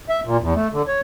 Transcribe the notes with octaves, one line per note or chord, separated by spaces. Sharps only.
E5
A#2
E2
A3
D3
C#5